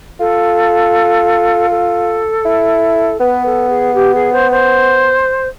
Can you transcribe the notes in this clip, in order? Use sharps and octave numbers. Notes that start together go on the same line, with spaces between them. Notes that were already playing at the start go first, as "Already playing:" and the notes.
F4 A4
A4
E4
B3 B4
A4
G#4
G4
G#4
C5
C5